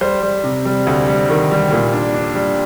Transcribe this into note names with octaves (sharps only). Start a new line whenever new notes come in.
G3 C5
G3
C3
G3
D2
G3
D#3
G3
A#2
D4
D4
G3